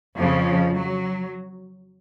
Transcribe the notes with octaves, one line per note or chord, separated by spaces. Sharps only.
F2 C#3 F3
F#3